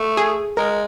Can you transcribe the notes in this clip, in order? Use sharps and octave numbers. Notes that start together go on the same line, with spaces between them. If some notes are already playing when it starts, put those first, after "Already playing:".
Already playing: A3
G#4
G#3 A#4